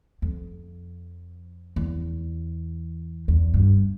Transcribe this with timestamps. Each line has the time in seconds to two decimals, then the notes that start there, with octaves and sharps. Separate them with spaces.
0.22 F2
1.76 E2
3.28 E2
3.54 G2